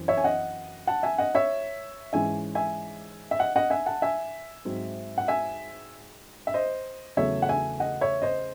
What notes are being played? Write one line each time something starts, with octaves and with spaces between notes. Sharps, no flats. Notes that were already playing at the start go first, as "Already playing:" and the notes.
Already playing: F#2 E3 C4
C#5 E5
G#5
D#5 F#5
F#5 A5
E5 G#5
D#5 F#5
C#5 E5
G#2 E3 G#3 C#4 E5 G#5
E5 G#5
E5
D#5 F#5
D#5 F#5
E5 G#5
F#5 A5
E5 G#5
G#2 F#3 C4
F#5
E5 G#5
E5
C5 D#5
E2 C#3 F#3 A3 C#5 E5
F#5
E5 G#5
D#5 F#5
C#5 E5
C5 D#5